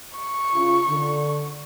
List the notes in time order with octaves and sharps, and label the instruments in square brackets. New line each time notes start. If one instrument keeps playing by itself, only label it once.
[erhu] C#6
[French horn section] C#3 F4
D3